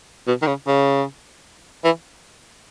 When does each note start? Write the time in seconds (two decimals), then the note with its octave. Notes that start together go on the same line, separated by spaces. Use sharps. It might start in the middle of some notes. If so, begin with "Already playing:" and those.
0.27 B2
0.42 D#3
0.47 C#3
0.67 C#3
1.84 E3